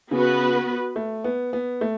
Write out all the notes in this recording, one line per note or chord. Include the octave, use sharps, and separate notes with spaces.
C#3 B3 F#4 B4
A3
B3
B3
A3